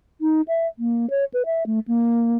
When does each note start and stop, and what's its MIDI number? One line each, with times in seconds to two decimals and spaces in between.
0.21 0.41 63
0.48 0.67 76
0.79 1.09 58
1.10 1.24 73
1.34 1.42 71
1.45 1.63 76
1.66 1.79 57
1.87 2.37 58